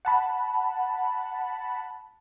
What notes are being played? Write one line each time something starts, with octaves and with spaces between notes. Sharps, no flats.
F#5 A5 B5